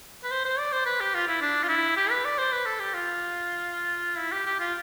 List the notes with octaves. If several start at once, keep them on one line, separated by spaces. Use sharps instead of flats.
B4
C5
C5
D5
C5
B4
G4
F4
E4
D4
F4
E4
G4
B4
D5
C5
B4
A4
G4
F4
E4
G4
G4
F4